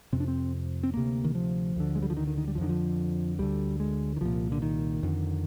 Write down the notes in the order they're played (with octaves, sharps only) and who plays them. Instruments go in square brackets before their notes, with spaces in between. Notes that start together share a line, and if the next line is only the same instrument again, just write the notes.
[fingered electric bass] F2 C3 C4
D4
C4
C4
D2 C3 A#3
D#3
F3
D2 D3
G#3
G3
F3
D#3
D#3
D#3
G3
F3
F2 D3 D#3
F3
D2 D3 G3
G#3
D#3
C2 A#2 F3
D3
D#3
F2 D3